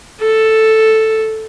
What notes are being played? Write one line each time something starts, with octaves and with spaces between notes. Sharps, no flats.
A4